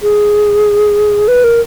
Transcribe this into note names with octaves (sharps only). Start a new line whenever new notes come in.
G#4
B4
A#4